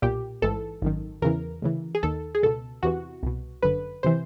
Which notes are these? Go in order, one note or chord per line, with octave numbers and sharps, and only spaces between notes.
B1 A#2 G4
A1 G#2 E3 A4
G#1 F#2 D#3
E2 C#3 E3 A#4
D2 C#3 E3
G#4
D#2 D#3 A4
G#4
C#2 B2 A4
E2 C3 E3 F#4
C2 B2
G1 F#2 D3 B4
C3 E3 C5